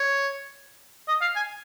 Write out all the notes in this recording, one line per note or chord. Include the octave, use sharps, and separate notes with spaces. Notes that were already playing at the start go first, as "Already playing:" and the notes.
Already playing: C#5
D#5
F5
G#5